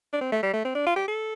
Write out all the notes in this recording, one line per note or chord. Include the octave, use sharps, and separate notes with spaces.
D4
C4
A3
G3
A3
C4
D4
F4
G4
A4